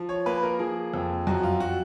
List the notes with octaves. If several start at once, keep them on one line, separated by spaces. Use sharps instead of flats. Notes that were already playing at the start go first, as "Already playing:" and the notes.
Already playing: F3
C#5
A#3 B4
A#4
F3 G#4
F2
F#2 F#4
F4
F#4